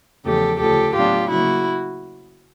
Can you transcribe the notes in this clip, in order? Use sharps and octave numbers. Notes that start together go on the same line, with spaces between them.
E2 C#3 F3 A3 G4 A4
D2 C#3 F3 G4 A4
A2 F#3 B3 D4 F4 G4
C#3 F#3 A#3 E4 F#4